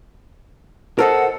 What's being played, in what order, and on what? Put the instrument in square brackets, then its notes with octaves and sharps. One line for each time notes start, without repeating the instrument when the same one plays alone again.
[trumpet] A4 [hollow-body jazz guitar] A#4 C5 D#5 [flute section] F#5